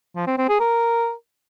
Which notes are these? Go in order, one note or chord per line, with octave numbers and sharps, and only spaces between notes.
F3
C4
C4
G#4
A#4